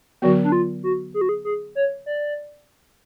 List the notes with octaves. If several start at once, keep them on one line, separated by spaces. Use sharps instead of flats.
D3 F#3 B3 F#4
D4
F4
F#4
G#4
F#4
G#4
G#4
C#5
D5